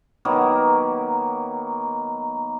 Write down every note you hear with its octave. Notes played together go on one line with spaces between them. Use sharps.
D#3 F#3 A#3 B3